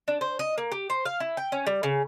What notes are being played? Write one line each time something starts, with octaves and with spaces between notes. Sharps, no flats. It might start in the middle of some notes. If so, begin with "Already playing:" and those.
D4
C5
D#5
A#3
G4
C5
F5
E4
G5
C#4
G3
C#3